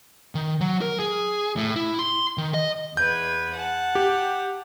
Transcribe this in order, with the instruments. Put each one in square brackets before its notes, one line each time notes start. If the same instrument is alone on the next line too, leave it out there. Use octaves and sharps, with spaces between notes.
[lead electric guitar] D#3
F#3
A#4
G#4
A2
E4
C6
D#3
D#5
[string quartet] E2 B4 G#6 [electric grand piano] G6
[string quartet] F#5 A5
[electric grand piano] G4